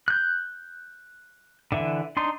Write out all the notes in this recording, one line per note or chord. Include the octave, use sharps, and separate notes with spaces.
F#6 G6
D3 E3 E5
D4 D#4 C6